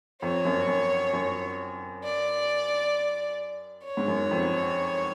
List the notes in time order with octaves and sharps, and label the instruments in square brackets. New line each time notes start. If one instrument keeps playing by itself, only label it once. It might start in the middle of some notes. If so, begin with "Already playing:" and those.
[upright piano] F2 [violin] C#5
[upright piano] F#2
F#2
F#2
[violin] D5
C#5
[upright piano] G#2
F#2
F2